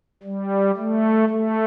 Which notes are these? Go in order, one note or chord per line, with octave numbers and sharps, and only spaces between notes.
G3
A3
A3